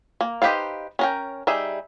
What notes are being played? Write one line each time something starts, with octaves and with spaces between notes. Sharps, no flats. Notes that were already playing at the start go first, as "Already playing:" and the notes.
A#3
D#4 G4 B4 C5 F5
C#4 A#4 G5
G3 D#4 G#4 E5